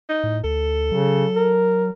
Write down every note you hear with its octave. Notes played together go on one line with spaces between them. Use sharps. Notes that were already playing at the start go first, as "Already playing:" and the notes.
D#4
A2
D2 A4
C#3 F#3
A#4